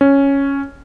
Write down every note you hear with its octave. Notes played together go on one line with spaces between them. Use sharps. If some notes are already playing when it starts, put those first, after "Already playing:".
C#4